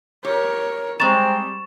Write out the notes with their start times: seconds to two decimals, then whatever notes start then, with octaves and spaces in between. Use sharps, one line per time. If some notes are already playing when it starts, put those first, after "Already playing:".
0.25 G4 A#4 C#5
1.00 G3 G#3 C4 A#5 C#6 A6 E7